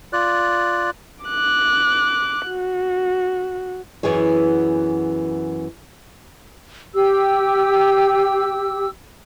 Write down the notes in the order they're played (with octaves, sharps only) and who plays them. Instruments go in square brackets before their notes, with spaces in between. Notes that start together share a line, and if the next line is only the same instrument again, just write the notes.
[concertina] F4 D5 F#6
[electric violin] D6 F#6
F#4
[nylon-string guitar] F#2 E3 B3 G#4 C#5
[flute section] G4 E6